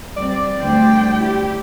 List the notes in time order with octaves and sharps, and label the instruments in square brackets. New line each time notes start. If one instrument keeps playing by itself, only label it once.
[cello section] G3 C4 [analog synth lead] D5
[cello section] D2 G3 C5 [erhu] G5
[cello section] E4 G4